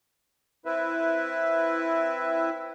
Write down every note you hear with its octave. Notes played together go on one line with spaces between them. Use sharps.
C4 E4 B4 E5